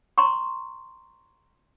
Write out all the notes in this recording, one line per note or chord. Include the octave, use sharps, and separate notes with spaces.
A#5 C6 C#6